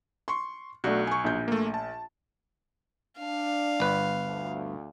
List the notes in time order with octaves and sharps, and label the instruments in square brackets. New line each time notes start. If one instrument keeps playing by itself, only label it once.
[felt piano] C6 C#6
[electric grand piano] B1 [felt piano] A3 D4 F#4
[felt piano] G#5 C#6
A#1 G6
[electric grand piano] A3 A#3
A5
[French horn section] D4 [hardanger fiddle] F5
[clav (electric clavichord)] G1 B4
[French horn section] D2